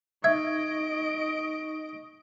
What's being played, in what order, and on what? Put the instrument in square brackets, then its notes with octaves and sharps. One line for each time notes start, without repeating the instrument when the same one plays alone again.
[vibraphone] D#4 C#6 [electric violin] D#5 D7 [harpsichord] E5 [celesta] G#6